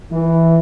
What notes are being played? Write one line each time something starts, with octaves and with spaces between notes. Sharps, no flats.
E3